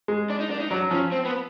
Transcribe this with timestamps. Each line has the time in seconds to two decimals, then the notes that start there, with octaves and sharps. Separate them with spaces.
0.08 G#3
0.30 D4
0.40 D#4
0.51 D4
0.60 D#4
0.70 F#3 D4
0.91 F3 C#4
1.12 C4
1.25 B3